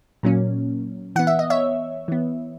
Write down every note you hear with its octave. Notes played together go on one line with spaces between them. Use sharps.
A#2 F#3 A#3 C#4
E3 B3 F#5
E5
D#5
C#5 E5
E3 B3